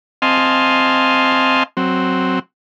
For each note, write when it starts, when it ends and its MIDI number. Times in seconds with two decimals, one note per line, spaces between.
0.22 1.63 60
0.22 1.63 75
0.22 1.63 77
0.22 1.63 80
0.22 1.63 81
0.22 1.63 84
1.77 2.39 54
1.77 2.39 60